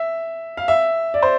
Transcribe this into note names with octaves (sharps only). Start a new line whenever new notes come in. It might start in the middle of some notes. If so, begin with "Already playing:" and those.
Already playing: E5
F5
E5
D5
C5